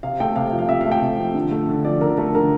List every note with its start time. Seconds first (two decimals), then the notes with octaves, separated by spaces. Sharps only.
0.03 C3 F5
0.20 A3 G5
0.36 C3 F5
0.47 F5
0.52 F3
0.59 F5
0.69 C3 E5
0.81 F5
0.86 A3
0.92 G5
1.02 C3
1.18 F3
1.35 D3
1.51 A3
1.69 D3
1.85 F3 D5
2.01 D3 A#4
2.18 A3 A4
2.34 D3 A#4